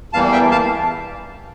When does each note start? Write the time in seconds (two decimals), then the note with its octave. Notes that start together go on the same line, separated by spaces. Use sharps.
0.13 E2 E3 G3 A#3 F5 A5
0.32 E5 G5
0.51 F5 A5